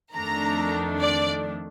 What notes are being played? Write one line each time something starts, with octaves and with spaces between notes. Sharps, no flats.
F2 D#3 A3 D4 A#5
D5